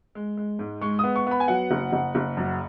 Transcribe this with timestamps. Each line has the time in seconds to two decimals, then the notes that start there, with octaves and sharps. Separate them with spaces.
0.15 G#3
0.37 G#3
0.59 G#2
0.81 G#3 C#6
0.99 B3 D#6
1.16 C#6
1.27 B3 B5
1.40 G#5
1.48 F#3 F#5
1.71 F#1
1.93 F#1
2.15 F#1
2.37 F#2